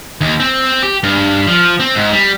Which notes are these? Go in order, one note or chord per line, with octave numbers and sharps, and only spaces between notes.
D#2
C4
G4
G2
F3
C4
G#2
G3